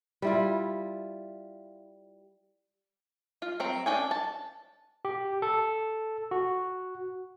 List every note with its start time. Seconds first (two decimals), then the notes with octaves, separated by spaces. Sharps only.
0.22 G3 E4 F4
3.42 F4
3.60 F#3 C4 A#5
3.86 C#4 D4 F#4 G5 G#5
4.11 A5
5.05 G4
5.42 A4
6.31 F#4